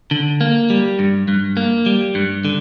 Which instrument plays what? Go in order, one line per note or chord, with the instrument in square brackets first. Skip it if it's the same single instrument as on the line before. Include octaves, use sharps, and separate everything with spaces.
[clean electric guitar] D3
A#3
G3
G2
G2
A#3
G3
G2
D3